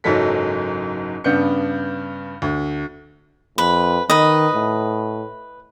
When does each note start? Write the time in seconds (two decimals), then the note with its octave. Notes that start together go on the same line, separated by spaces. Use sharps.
0.04 F#1 G#2 F#3 G#3 A4 B6
1.24 G2 C#3 B3 D4 G6 C#7
2.42 D2
3.58 F2 B4
4.10 D#3 B4 D#5
4.54 A2